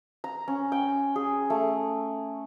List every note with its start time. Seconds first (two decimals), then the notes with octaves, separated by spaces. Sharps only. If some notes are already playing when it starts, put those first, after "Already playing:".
0.24 A#5
0.48 C#4
0.72 G5
1.16 G#4
1.50 A3